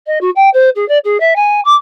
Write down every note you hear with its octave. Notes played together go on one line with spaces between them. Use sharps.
D#5
F#4
G5
C5
G#4
D5
G#4
E5
G#5
D6